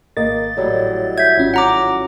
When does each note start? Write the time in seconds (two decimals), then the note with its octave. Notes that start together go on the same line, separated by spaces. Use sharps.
0.17 G#1 A#3 D#5 A6
0.57 A2 F#3 G3
1.18 E5 G6 G#6 B6
1.38 G#1 C#4 F4
1.54 F#5 A#5 D6